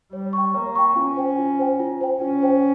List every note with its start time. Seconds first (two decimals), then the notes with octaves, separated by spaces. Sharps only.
0.12 G3 C#5
0.33 G5 C#6
0.54 A#3 C#5
0.75 G5 C#6
0.96 C#4 F4
1.17 C5 G5
1.38 F4
1.59 C5 G5
1.80 F4
2.01 C5 G5
2.21 C#4 F4
2.42 C5 G5